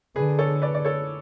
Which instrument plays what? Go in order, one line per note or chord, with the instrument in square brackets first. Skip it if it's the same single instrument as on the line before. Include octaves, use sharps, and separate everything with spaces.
[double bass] D3 [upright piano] G#4 B4
[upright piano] A4 C#5
B4 D5
D5
A4 C#5